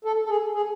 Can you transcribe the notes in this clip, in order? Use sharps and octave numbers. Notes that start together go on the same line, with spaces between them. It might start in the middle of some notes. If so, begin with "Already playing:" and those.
A4
A4
G#4
G#4